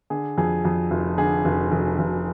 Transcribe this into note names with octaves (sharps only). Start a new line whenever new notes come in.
D3 G#4
F2 G#4
F2
F1
D3 G#4
F1
F1
F1